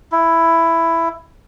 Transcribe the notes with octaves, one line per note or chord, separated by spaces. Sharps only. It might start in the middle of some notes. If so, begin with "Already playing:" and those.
E4